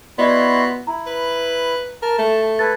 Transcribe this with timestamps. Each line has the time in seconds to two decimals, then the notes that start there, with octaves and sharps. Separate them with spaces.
0.18 B3 E4 F#4 D5 D#5 C6 G#6
0.87 E4 A#5
1.07 B4
2.02 A#4 A5
2.19 A3
2.59 A4 B4 G#6 A6